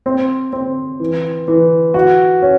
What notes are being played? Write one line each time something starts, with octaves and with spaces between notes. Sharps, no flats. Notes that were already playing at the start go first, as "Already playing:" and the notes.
C4
C4
E3
E3
F#4
C#4